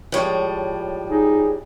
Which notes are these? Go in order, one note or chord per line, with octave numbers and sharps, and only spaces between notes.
A2 F3 G3 G#3 C#5
D#4 G#4